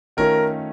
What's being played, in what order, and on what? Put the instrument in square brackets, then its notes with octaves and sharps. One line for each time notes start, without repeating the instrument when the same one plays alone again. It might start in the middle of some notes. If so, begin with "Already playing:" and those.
[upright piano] D#3 A3 C#4 F4 [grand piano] A#4